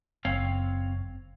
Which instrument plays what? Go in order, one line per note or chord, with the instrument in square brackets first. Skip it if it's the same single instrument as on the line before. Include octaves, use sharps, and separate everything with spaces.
[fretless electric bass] F#1 [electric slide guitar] C4 C#5 F5